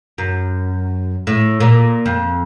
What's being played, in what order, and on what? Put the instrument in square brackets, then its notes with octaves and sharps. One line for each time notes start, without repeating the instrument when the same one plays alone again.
[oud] F#2
A2
A#2
F2